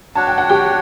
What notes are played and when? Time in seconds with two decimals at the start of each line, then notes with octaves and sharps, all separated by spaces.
0.15 D4 F#4 C#5 A5
0.27 G5
0.38 F#5
0.49 G4 G5